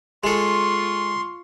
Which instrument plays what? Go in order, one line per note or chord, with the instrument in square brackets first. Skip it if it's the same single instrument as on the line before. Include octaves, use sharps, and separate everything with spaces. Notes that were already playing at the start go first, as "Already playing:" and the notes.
[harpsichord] G#3 A4 [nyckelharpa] F4 C#6 [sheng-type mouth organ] C6